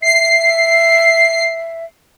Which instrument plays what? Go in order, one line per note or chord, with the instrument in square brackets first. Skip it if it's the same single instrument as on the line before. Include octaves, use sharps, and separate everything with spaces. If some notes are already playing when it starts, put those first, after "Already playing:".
[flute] E5 [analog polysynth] C7